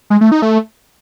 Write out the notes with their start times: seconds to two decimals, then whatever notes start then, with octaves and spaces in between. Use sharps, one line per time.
0.10 G#3
0.21 A3
0.32 D#4
0.42 A3